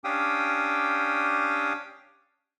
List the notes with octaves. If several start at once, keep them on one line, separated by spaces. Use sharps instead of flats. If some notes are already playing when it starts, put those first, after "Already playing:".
C#4 D4 G4 F5 G5 D#6